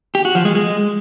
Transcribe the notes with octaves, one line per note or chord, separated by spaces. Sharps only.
G4
F#4
F3
G#3
G#3